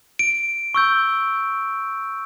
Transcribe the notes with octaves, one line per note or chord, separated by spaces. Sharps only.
D7
C#6 E6 G6